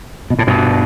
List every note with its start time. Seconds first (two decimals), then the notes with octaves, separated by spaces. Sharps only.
0.30 B2
0.39 A2
0.47 G2 B2